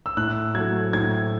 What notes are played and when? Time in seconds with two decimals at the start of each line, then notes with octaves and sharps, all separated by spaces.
0.06 E6
0.17 A2 F#6
0.55 F#3 A3 G#6
0.93 A2 G#6